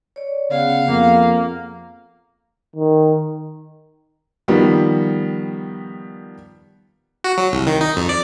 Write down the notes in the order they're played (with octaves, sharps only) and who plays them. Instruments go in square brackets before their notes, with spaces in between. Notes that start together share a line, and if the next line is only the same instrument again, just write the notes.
[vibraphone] C#5 D5
[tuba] C#3 [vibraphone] B3 G#4 [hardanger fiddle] F5 F#5
[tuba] F2 [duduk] A#3
[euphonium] D#3
[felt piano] D#3 F3 G3 B3
[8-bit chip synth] F#4
F#3
C2
D#3
D#4
F2
D5